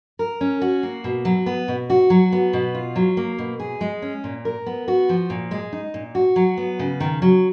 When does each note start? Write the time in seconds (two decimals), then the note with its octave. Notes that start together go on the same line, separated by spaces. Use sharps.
0.19 A#4
0.41 C#4
0.61 F#4
0.83 A#3
1.04 B2
1.25 F#3
1.46 B3
1.68 B2
1.90 F#4
2.10 F#3
2.32 B3
2.53 B2
2.75 F4
2.96 F#3
3.17 A#3
3.38 B2
3.59 G#4
3.81 G#3
4.02 C#4
4.24 A#2
4.45 A#4
4.66 B3
4.88 F#4
5.09 F3
5.30 A#2
5.51 G#3
5.72 D#4
5.94 A#2
6.15 F#4
6.36 F#3
6.57 B3
6.79 C#3
7.00 D#3
7.22 F#3